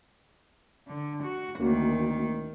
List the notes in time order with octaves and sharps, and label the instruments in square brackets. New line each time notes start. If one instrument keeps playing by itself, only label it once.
[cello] D3
F#4
[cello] D2 D#3 [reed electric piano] A#3 C#4 F#4